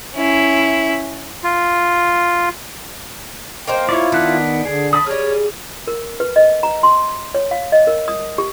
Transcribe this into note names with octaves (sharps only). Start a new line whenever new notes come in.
C#4 E4
F4
A#3 D#4 C5 G5
E4 F4 C#5 D5
D#3 B3 D4 F#6
D3 G#4
A5 B5 D#6
G3 G#4 C#5 D5 F6
A#4
B4
D#5
A#5
C6
C#5
F5
D#5
A#4
D#6
G4